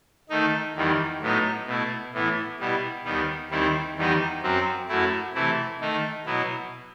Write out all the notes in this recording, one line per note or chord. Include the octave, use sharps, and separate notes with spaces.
D#3 A3 D#4
E2 D#3 G3
A2 F#3 B3 D#4
B2 A3 E4
A2 E3 B3 E4
B2 G3 B3 E4
D#2 D#3 G3 B3
D#2 D#3 G3 C4 E4
E2 D#3 G3 B3 D#4
F#2 F#3 C4
F#2 F#3 A3 E4
C3 E3 A3 E4
D#3 A3 D#4
B2 F#3 B3 E4